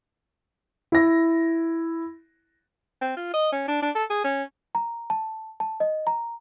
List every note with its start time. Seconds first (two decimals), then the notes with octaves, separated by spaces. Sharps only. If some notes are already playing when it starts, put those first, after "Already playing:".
0.92 E4 A#6
3.01 C4
3.17 F4
3.34 D#5
3.52 C#4
3.68 D4
3.82 D4
3.95 A4
4.10 G#4
4.24 C#4
4.75 A#5
5.10 A5
5.60 A5
5.80 D#5
6.07 A#5